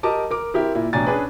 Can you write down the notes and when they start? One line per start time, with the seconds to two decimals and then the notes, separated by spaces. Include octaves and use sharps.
0.03 G4 A#4 D#5 A5 D6
0.31 A#4 D6
0.54 C4 E4 G4 A#4
0.75 A#2 E4
0.93 A1 B2 D4 G#5 A#5 A6
1.07 C#4 D4 G#4 B4